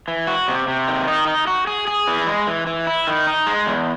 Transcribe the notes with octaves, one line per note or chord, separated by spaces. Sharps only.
E3
F#4
C3
C3
D#3
D#4
D#4
F#4
G#4
G#4
E3
G#3
E3
E3
E4
D#3
D#4
G#3
E2